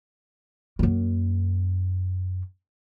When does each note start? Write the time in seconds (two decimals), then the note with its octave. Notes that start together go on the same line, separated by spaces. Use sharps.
0.79 F#2 A#3